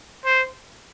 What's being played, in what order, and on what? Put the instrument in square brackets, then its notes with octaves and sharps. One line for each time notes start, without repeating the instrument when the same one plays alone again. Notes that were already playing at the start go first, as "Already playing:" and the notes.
[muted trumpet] C5